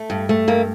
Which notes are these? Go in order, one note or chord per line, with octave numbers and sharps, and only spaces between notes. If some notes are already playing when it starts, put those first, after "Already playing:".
Already playing: A3
G2
A3
G2 A#3